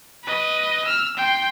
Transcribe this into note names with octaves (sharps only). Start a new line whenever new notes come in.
B4 D#5
E6 F6
G5 C6